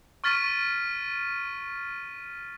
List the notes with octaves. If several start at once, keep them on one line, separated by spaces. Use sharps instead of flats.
C#6 F6 A6 B6 D#7